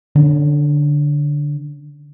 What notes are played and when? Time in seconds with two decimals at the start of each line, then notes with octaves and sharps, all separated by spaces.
0.16 D3 C#4